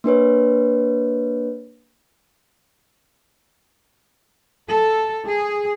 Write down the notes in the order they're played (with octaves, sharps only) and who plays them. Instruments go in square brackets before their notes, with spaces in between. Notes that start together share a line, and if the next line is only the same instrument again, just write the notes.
[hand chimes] A#3 D4 B4 C#5
[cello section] A4
G#4